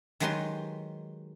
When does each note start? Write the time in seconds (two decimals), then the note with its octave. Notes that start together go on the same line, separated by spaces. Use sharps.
0.20 D#3 F#3 G#3 G4 B4 C6